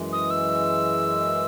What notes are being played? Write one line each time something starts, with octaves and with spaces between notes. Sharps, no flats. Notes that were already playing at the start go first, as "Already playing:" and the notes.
Already playing: F#2 E3 G#3
D#6
E6